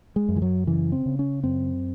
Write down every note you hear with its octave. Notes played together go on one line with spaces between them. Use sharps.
G#3
F#2
E3
F#3
C#3 E3
C4
C#3
C#4
F#2 C4